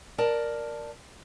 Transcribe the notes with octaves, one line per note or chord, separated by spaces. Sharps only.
A#4 D5 A5